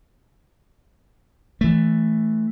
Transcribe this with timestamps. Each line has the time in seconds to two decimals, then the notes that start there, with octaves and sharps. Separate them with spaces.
1.61 E3 A3